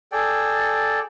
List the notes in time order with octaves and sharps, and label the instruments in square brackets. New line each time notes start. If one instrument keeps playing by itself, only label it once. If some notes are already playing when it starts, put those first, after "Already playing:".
[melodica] G#4 A4 D5 G5